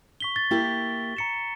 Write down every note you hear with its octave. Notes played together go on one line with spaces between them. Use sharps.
C#6 B6 G7
A6
A#3 E4 G4
A#5 C#7 E7